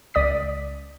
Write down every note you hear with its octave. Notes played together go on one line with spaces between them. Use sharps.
C#2 D5 D#6 B6